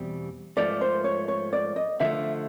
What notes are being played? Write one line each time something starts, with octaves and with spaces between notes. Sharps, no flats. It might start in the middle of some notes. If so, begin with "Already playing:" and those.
Already playing: E2 B2 G3 C4
G#2 F3 A3 D5
C5
C#5
C#5
D5
D#5
D3 F3 A3 E5